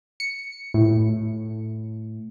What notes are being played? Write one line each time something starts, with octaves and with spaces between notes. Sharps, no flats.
C#7
A2